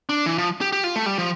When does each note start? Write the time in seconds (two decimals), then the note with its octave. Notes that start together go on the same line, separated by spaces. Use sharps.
0.09 D4
0.26 E3
0.38 F3
0.61 G4
0.72 G4
0.84 F4
0.96 A3
1.06 G3
1.18 F3